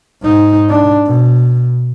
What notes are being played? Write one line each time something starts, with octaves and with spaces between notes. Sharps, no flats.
G#2 D#4
D4
B2